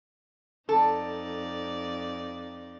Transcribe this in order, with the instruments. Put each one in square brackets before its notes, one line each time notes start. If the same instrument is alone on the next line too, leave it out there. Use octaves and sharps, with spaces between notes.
[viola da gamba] F2 D#4 D5 [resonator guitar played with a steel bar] A4